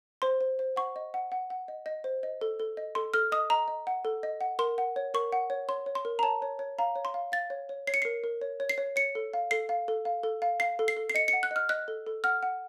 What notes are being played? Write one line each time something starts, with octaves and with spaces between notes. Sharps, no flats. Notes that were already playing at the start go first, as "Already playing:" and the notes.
C5 C6
C5
C5
F#5 C#6
D#5
F#5
F#5
F#5
D#5
D#5
C5
D#5
A4
A4
D#5
A4 C6
A4 F6
D#5 D#6
D#5 A#5
D#5
F#5
A4
D#5
F#5
A#4 C6
F#5
C#5
A#4 C#6
F#5
C#5
C#5 C6
C#5
C6
A#4
A#5
C#5 A5
C#5
C#5
F5 A#5
C#5
C6
F5
F5 A6
C#5
C#5
C#5 C7
C#7
A#4 C7
A#4
C#5
C#5
C7
C#5
C#5 C#7
A4
F5
A4 C7
F5
A4
F5
A4
F5
F5 C7
A4
C7
A4
C7
D#5 C#7
C#7
F#5
F#6
D#5 F6
D#5 F#6
A4
A4
F#5 F6
F#5